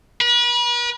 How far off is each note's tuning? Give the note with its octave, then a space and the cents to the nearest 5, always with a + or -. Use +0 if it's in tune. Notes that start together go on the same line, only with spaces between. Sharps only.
B4 -40